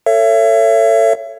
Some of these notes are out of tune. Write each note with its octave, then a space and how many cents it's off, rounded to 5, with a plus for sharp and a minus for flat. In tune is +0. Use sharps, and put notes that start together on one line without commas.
A4 +25 C#5 +0 E5 +35